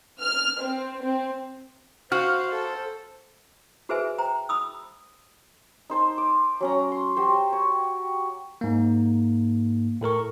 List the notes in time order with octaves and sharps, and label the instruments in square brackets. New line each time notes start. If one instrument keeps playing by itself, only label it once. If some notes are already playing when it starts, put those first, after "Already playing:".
[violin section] F6
C4
C4
[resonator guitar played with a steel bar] F#4 [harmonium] C5 [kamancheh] F5 [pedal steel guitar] F6
[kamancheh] A4
[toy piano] F#4 G#4 B4 C5 E5 G#5
C5 G5 A#5
B5 D#6 E6
[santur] D#4 C5 A5
D6
F#3 C#4 A#5
C6
F#4 G4 C5
C#5
[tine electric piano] G#2 A#3
A2 A4 A#4 C#6